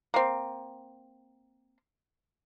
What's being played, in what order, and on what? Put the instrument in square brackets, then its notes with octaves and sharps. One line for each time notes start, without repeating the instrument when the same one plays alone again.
[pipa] A#3 C4